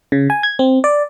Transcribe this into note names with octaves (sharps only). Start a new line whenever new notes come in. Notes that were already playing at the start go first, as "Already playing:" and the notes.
C#3
G#5
G#6
C4
D5